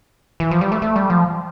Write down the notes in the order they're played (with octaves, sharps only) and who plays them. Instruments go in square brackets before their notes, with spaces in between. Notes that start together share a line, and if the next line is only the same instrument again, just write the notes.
[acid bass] E3
F3
G3
A3
A3
G3
F3